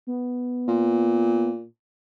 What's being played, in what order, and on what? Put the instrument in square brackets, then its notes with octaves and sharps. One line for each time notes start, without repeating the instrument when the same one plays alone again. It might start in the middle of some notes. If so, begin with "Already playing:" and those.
[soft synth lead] B3
[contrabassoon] A#2